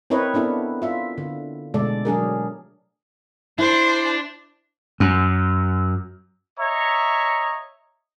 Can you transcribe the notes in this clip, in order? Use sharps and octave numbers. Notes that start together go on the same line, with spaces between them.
C4 E4 A#4 B4 C#5 D#5
B3 D4 E4 A4
F4 E5
D3
B2 D3 G#3 A3 A4 D5
F#3 D4 G#4 A#4
D4 E4 C5 A5
F#2
C#5 D#5 E5 A#5 C#6